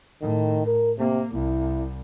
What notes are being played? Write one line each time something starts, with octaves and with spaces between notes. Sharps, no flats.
A2 D#3
A#4
C3 A#3
C2 E4